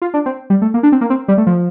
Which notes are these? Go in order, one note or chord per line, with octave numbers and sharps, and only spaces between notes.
F4
D4
C4
G3
A3
A#3
D4
C4
A#3
C4
G3
A3
F3